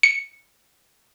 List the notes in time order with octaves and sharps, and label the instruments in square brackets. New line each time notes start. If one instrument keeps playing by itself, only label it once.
[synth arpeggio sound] C#7